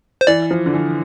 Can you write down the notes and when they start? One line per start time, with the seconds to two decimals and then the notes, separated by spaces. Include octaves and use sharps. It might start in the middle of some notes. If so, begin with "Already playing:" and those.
0.21 C5
0.27 E3 D5
0.51 F3
0.66 D3
0.74 E3